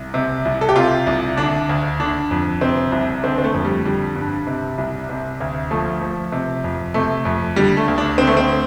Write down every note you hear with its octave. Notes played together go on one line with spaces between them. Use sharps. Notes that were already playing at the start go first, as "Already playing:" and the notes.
Already playing: C2
C3
C2
A4
G4
C3 F4
C2
D3 D4
D2
D3 D4
F2
C3 C4
C2
D3 C4
C4
A3
F2
G3
D3 G3
G2
C3
C2
C3
D2
F3 A3
F3
C3
F2
C3 A3
F2
D3 G3
A3
D2
D4
D3 C4
A3
C4